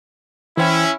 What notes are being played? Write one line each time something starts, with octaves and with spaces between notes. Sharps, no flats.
E3 C#4 E4 C5 G5